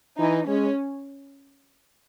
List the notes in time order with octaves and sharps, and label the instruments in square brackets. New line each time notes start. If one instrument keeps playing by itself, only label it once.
[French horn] E3 [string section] D#4
[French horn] G#3 [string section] C#4